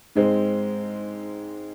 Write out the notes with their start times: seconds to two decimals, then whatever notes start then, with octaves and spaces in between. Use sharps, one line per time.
0.15 G#2 G#3 C4